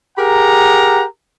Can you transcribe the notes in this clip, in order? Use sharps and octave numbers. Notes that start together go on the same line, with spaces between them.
G4 G#4 A#4 F#5 A#5